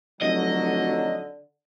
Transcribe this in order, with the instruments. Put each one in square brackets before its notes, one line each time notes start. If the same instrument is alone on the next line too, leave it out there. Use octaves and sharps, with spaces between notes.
[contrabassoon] F1 [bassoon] D3 [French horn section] F#3 [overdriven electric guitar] D#5